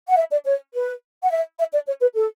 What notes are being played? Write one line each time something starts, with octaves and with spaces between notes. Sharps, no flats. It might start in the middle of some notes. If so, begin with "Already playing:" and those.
F#5
E5
D5
C#5
B4
F#5
E5
E5
D5
C#5
B4
A4